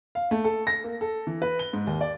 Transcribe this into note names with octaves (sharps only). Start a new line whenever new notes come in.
F5
A3
A4
A#6
A#3
A4
E3
B4
G7
G#2
D#2
D5